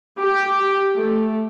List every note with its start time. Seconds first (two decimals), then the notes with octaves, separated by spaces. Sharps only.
0.20 G4
0.96 A3